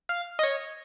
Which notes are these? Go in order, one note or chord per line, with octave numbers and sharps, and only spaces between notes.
F5
D#5
C#5